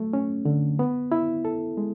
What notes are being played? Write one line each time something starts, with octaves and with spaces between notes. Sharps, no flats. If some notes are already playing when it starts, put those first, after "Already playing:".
Already playing: F#3 A3
C#4
D3
B3
E4
A4
G#3